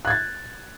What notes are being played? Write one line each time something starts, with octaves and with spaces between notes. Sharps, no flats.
F#6 G#6 A6